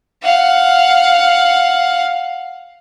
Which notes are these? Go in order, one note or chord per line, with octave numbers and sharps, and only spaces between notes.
F5 F#5